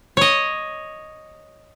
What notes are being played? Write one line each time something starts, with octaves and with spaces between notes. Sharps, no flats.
C#5 D#5